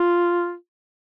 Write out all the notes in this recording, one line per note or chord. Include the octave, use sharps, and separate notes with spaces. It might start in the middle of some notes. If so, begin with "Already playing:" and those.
Already playing: F4